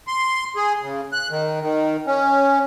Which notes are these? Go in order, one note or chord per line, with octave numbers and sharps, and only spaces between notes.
C6
G#4
C#3
F#6
D#3
D#3
C#4